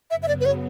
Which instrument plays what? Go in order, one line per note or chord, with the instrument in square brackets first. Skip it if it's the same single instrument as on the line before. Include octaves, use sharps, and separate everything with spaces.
[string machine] F#2 C#3 F#3 B3 [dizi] E5
[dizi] E5
D5
B4
C#5